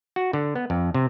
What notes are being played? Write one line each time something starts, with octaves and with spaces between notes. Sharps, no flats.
F#4
D3
B3
F2
C3